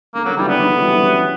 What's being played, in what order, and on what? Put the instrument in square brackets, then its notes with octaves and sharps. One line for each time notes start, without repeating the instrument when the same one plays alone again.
[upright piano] D3 [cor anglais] A#3
[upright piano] D3 [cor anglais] F#3
[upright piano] C#3 E3 [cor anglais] G3
[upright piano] D3 F#3 [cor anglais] B3
[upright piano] D3 F#3
D3
E3 G3
E3 G3
C#4 E4